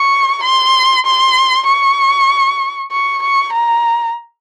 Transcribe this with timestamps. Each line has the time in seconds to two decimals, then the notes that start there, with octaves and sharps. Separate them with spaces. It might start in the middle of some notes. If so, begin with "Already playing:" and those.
Already playing: C#6
0.43 C6
1.06 C6
1.67 C#6
2.92 C#6
3.23 C#6
3.53 A#5